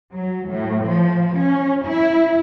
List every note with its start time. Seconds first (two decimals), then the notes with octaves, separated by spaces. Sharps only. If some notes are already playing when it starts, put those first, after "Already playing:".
0.13 F#3
0.49 A2
0.84 F3
1.37 C#4
1.85 E4